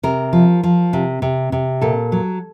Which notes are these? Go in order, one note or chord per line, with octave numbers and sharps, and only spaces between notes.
C3 A#4
F3
F3
C3
C3
C3
A#2 A4
F#3